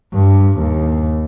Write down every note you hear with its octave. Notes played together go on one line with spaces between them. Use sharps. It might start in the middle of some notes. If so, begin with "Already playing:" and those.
G2
D#2